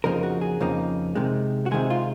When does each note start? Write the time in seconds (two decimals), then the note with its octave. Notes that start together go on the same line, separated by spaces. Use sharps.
0.04 F2 C#3 F3 A#3 D#4 A#4
0.23 F#4
0.41 G#4
0.61 F2 C#3 F3 A#3 D#4
1.15 C3 D#3 G#3
1.66 F#4
1.71 C3 D#3 G#3 G#4
1.90 F4